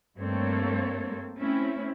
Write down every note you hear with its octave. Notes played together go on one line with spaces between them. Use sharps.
G2 A3 A#3 C4 A4 C#5
A3 C4 C#4 E4